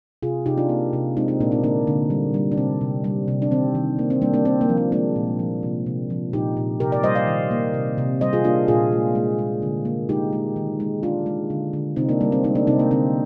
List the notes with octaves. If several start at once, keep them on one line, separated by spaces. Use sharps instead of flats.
C3 F4 G#4
C3 D#4 G4
D4 F4
A#3
C3
G#3 C4 D#4
C4 D#4
A#2 A#3 D4
C4 D#4
D3 A#3 D4
D3
G3
G3
D4
C3 C4
C3
G3
C3
D4
D#3 C4
D#3
A#3
C4
G3 A#3 D4
A#3 D4
A#3 C4
A#3
F3
C4
G#3 A#3 D4
A#2
F3
C3
C3
F3
A#2 D#4 G4
A#2
C3 G4 A#4
A#4 D5
G3 C5 D#5
D5 F5
D#3
A#3
C3
C3
G3 C5 D#5
F4 G#4
A#3 D4 F4
A#2 F4 G#4
G#3
G#3
G#3
D3
A#3
G#3 D#4 G4
G#3
D#3
G#3
G#3 D4 F4
G#3
D3
D3
C3 C4 D#4
A#3 D4
G3 A#3
C4
G#3 C4 D#4
A#3 D4
C3 C4 D#4
A#3
D3 C4